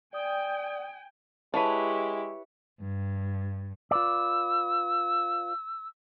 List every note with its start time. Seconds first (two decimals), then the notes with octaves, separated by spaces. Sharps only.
0.13 D5 G5 G#5 D#6
1.54 G#3 E4 G4 B4 C#5 A5
2.79 G2
3.91 F4 B4 D5 E6